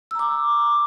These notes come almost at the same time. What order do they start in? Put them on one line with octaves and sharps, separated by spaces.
E6 A#5 D6